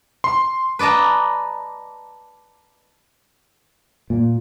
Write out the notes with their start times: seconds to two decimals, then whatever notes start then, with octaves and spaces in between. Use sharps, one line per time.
0.24 C6
0.79 B4 D5 D#5 A5 A#5
4.10 A#2